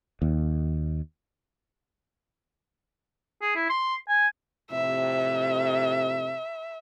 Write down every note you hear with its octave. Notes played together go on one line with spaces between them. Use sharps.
D#2
G#4
E4
C6
G#5
F2 A2 C3 E5